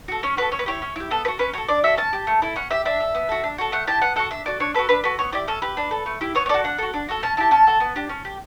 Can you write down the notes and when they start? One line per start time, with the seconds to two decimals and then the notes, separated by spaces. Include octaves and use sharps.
0.08 F#4 A4
0.23 C#4 C#5
0.37 F#4 A4 B4
0.52 C#4 C#5
0.59 B4
0.66 E4 G4 C#5
0.82 C#4
0.96 E4 G4
1.11 B3 A4
1.25 F#4 A4 B4
1.39 C#4 B4
1.54 F#4 A4 C#5
1.68 D4 D5
1.84 F#4 A4 E5
1.97 C#4 A5
2.13 G4
2.27 A3
2.42 E4 A4
2.56 C#4 F#5
2.71 G4 E5
2.85 D4 E5
3.00 A4
3.15 B3
3.29 F#4 A4
3.44 D4
3.58 F#4 A4
3.72 A3 F#5
3.87 E4 G4 A5
4.02 B3 F#5
4.16 F#4 A4 F#5
4.31 D4 E5
4.46 F#4 A4 D5
4.60 D4 C#5
4.74 F#4 A4 B4
4.89 D4 B4
5.04 F#4 A4 B4
5.19 B3 C#5
5.32 E4 G4 D5
5.47 C#4 A4
5.62 G4 B4
5.77 D4
5.91 A4
6.06 A3
6.21 E4 G4
6.35 B3 C#5
6.46 C#5
6.49 F#4 A4 D5
6.64 D4 F#5
6.78 F#4 A4
6.93 D4
7.09 F#4 A4
7.23 C#4 A5
7.37 E4 G4 A5
7.51 C#4 A5
7.67 F#4 A4
7.80 B3
7.96 D4 G4
8.09 C#4
8.25 G4